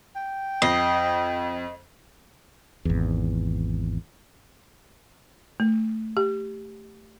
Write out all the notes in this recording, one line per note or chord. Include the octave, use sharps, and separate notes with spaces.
G5
F2 D#5 C7
G#1 E2
A3
G4